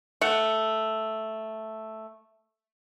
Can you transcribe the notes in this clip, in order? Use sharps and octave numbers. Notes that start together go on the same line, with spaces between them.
A3 F#5